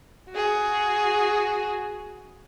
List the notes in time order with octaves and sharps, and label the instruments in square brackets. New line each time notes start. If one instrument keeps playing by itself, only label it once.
[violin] F#4 G#4